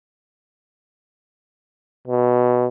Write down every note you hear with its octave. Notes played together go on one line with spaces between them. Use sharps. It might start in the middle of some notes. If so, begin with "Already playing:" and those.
B2